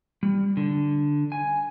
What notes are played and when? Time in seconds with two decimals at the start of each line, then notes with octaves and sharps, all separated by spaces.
0.23 G3
0.57 D3
1.32 G#5